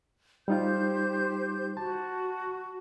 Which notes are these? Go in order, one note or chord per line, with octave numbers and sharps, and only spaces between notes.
G3 D#4 F4 G4 C5 G6
F#4 A5